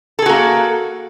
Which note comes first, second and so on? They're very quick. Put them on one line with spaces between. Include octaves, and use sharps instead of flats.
A4 G#4 F#4 A#3